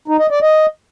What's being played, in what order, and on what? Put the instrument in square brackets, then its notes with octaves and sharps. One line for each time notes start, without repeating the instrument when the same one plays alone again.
[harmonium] D#4
D#5
D5
D#5